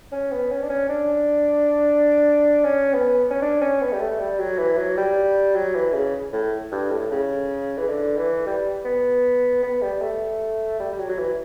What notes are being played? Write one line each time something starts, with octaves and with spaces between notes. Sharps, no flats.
C#4
B3
C#4
D4
C#4
D4
C#4
B3
C#4
D4
C#4
B3
G3
A3
G3
F#3
E3
F#3
G3
F#3
E3
C#3
A2
G2
A2
C#3
E3
D3
E3
G3
B3
B3
G3
A3
G3
G3
F#3
F#3
E3